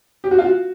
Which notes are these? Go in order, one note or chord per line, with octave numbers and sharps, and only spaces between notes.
G4
F#4
F4
F#4